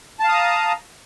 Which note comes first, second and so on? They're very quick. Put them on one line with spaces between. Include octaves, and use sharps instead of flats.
A5 F5 D#6 A#5